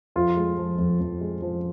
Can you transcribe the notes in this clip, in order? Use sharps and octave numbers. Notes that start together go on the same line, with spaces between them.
F2 F4
G#3
F3
F2
F2
G#3
F3